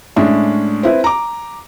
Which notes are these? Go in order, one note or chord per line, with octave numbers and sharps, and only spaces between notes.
A2 G#3 C#4 D4 E4
C4 E4 B4
A#5 D6